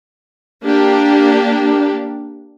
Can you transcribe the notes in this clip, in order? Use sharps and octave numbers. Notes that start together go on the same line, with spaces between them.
A#3 D4 G4